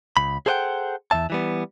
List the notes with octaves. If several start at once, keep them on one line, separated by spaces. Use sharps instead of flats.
C#2 B5
G#4 A4 C5 D5 F#5 G5
E2 G#2 E5 A5
E3 G3 B3